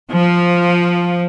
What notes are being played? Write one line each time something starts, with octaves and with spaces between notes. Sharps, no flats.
F3